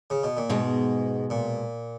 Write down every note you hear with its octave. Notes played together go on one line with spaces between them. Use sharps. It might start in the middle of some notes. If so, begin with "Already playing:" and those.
C#3
B2
A#2
E2 G#2 B2 G#3
A#2